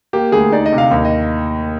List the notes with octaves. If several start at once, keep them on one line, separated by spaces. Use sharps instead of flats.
A#3 G4
D2 G#4
D#4 D5
D#5
C3
F5
D#2
D#5